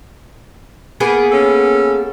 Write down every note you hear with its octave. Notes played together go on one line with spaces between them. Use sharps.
A#3 B3 G#4
C#4 A4